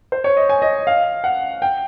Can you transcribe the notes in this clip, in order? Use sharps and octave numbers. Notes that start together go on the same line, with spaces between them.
C5
C#5
D#5
G#5
D#5
F5
F#5
G5